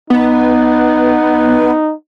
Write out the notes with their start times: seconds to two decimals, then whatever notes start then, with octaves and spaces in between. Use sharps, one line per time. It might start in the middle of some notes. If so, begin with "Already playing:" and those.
0.10 B3 D#4